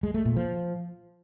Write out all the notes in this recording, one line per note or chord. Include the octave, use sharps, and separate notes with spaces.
G#3
A3
A#2
F3